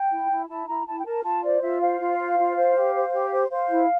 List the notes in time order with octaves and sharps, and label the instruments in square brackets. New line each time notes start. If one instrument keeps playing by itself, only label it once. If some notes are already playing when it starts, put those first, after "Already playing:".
Already playing: [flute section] G5
E4
E4
E4 A5
E4 A#5
E4 A5
G5
A#4 A5
F4 A5
C5 D5
F4 E5
C5 F5
F4
C5
F4
C5
G4
C5
G4
C5
C5 F5
E4